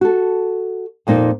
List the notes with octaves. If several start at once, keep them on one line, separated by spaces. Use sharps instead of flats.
F#4 A4
F2 A#2 A#3 D#4